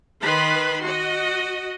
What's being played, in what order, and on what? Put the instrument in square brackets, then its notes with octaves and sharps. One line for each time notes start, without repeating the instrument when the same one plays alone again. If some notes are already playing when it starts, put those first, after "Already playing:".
[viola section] D#3 B4 B5 C6
F#4 D#5